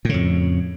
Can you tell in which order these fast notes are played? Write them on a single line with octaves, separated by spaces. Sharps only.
A2 C#3 F2